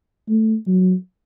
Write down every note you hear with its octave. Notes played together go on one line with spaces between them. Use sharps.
A3
F#3